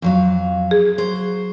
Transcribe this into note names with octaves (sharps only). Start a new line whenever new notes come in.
F2 F#3 F5
G#4
F#3 C5